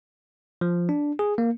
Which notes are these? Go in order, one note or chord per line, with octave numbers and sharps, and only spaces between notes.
F3
D4
G#4
A#3